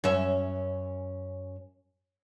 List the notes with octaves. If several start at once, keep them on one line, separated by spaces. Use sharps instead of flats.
F#2 C#4 E5